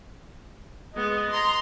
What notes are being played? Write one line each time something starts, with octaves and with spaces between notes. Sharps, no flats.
G#3 B3 D#5
A#5 C6